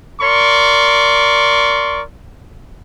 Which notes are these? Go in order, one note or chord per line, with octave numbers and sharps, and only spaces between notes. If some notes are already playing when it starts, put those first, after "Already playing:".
A#4 D5 C6 C#6